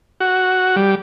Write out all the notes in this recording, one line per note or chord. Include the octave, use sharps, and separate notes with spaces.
F#4
G3